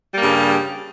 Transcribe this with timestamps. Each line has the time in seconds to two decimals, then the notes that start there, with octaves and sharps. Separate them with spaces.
0.12 G3
0.16 A#3
0.20 G2
0.24 C#3